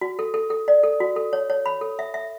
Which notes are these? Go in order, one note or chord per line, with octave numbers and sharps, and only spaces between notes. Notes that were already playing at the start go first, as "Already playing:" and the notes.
F#4
A4
A4
A4
D5
A4
F#4
A4
C#5
C#5
B5
A4
E5
E5